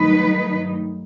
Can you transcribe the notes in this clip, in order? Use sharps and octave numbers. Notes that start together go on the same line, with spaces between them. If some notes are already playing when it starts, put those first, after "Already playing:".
Already playing: G2 D#3 F#3 A3 D#4 B4